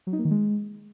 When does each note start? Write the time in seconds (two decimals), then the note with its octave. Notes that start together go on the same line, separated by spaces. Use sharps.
0.07 F#3
0.13 D#4
0.19 A#3
0.25 D#3
0.31 G#3